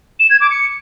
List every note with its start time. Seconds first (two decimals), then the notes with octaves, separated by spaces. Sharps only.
0.19 E7
0.30 G#6
0.40 D6
0.51 C#7